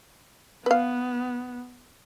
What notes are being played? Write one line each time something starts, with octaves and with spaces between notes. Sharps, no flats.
B3 B4 F5